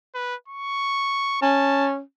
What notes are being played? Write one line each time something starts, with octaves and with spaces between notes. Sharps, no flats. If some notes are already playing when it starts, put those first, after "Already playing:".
B4
C#6
C#4 A5